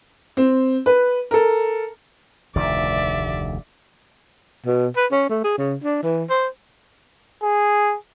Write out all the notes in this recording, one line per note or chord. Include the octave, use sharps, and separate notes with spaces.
C4
B4
A4 A#4
F1 D2 D#3 D5 E5
B2
B4
C#4
A3
G#4
C#3
D4
E3
C5
G#4